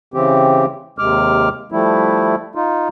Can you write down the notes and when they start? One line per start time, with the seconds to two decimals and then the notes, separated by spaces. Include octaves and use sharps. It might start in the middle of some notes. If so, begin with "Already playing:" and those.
0.14 C#3 E3 C4 G4
0.99 D#2 C3 G#3 D6 F6
1.72 F3 G3 A3 E4
2.55 D#4 F4